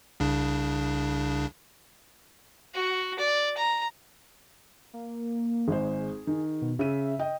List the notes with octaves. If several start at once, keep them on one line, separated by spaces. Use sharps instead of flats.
C2 C#3 D4
F#4
D5
A#5
A#3
G#1 G#3 G#4 C5
D#3
B2
C#3 E5 D#7
D#5 G5